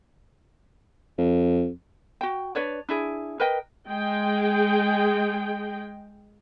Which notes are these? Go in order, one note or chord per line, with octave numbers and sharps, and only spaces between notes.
F2
F#4 G5
D4 B4 C#5 D5
D4 E4 G#4
A#4 B4 D#5 G5
G#3 G#4 G5